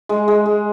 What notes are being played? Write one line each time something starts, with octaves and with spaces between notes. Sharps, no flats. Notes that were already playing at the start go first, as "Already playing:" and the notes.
G#3
G#3
G#3